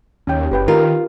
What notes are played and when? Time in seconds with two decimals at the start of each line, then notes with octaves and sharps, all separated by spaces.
0.27 D#2 C#4 G5
0.51 F#1 G4 B4 G5
0.68 D#3 F4 G4 A#4